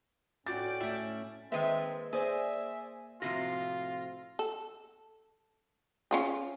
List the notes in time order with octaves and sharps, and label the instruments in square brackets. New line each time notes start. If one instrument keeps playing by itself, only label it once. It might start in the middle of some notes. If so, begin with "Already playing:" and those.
[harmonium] A2 C#4 [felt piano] F#4 A6 [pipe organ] D5 G5 D6
[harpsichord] A3 E4
[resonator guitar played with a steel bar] D#3 G#3 E5 [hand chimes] A#3 B4 [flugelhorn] C4
[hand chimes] A#3 A#6 [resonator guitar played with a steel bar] G#4 [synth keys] C5 D5 G#5 [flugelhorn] E5
[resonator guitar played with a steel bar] A2 C3 F3 [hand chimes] C4 F#4 [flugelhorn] F4 [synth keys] A#6 C7
[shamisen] A4
C#4 F4 G#4